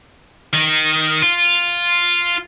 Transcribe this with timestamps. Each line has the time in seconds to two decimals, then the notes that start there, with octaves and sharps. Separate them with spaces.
0.53 D#3
1.22 F4